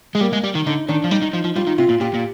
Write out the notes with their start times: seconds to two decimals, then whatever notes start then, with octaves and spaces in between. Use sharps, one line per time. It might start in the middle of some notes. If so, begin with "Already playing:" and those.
0.15 G#3
0.21 G3 A#3
0.33 G#3
0.43 G3
0.55 D#3
0.66 D3 D#4
0.88 D#3 D4
1.04 F3
1.11 G3 D#4
1.22 D#3
1.34 F3
1.45 F3
1.56 G3 F4
1.67 D#3
1.78 C3 F4
1.89 A#2
2.00 A#2 G4
2.14 A#2